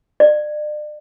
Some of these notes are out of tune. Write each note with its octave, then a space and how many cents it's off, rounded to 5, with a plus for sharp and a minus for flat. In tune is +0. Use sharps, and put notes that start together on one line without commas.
D5 +40